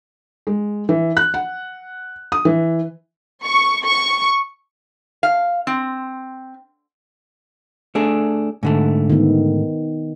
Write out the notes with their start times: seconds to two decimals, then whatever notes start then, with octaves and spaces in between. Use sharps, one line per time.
0.47 G#3
0.89 E3
1.17 F#6
1.34 F#5
2.32 D#6
2.45 E3
3.45 C#6
3.85 C#6
5.23 F5
5.67 C4
7.95 A3 D4 G#4
8.63 G#2 D3 A3
9.10 D#3 B3